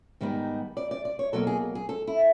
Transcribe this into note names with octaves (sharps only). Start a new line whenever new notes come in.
G#2 D#3 G3 B3 D#4
D5
D5
D5
C#5
B2 F#3 A#3 A4
G#4
G#4
A4
E4